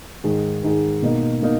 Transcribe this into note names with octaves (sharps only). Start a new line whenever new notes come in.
G#2 D#3 G#3
G#2 D#3 G#3
B2 A#3 D#4
B2 A#3 D#4